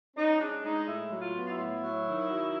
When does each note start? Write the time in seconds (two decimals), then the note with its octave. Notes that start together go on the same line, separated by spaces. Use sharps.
0.16 C#4 D#4
0.40 G#3 D4
0.64 G#3 D#4
0.87 A2 E4
1.11 F#3
1.19 F4
1.34 B3
1.46 F4
1.51 E4
1.58 A2
1.82 F#3
2.06 D#3
2.29 F#3